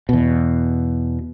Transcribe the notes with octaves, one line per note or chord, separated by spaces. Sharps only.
E2 B2